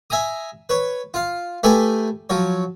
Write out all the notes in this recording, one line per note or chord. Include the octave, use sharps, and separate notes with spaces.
E5 G#5 A#5 D#6
B4 C#5
F4 F5
A3 G4 A4 B4 G#5
F3 F#3 C#5